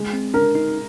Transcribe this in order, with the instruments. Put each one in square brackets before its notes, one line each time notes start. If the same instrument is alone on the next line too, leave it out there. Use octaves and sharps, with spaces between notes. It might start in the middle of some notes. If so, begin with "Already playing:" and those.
Already playing: [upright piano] G#3
[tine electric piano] C4
[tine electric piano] D4 [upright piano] A#4
[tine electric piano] D#4